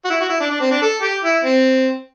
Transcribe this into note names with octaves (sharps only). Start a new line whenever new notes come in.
F#4
E4
F#4
E4
D4
D4
C4
D4
A4
G4
E4
C4